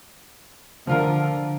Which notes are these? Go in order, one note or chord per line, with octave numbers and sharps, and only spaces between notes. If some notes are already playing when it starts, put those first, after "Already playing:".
D3 F3 F4 A#4